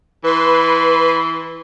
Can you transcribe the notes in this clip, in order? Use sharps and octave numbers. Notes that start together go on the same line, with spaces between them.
E3 B4 C6